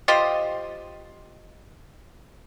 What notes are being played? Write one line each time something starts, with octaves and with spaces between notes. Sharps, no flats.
F4 G4 C5 D#5